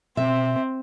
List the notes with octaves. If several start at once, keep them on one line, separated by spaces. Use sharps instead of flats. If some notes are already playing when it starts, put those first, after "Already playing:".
B2 C4 E5